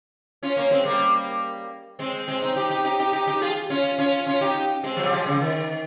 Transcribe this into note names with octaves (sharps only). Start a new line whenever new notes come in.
C#4 F4
A#3 C#4
G#3 C4
G3 A#3
G#3 C4
G#3 C4
C4 D#4
D#4 G4
D#4 G4
D#4 G4
D#4 G4
D#4 G4
D#4 G4
F4 G#4
C#4 F4
C#4 F4
C#4 F4
D#4 G4
G#3 C4
F3
G3
F3 G#3
C#3
D#3